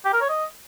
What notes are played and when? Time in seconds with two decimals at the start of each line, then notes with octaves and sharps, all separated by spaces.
0.05 G4
0.13 A#4
0.21 C#5
0.30 D#5